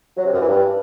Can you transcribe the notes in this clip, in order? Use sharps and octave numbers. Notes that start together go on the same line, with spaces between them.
F#3
C3
F#2
E3
G2